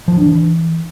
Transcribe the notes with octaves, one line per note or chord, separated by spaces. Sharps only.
F3
D4
E3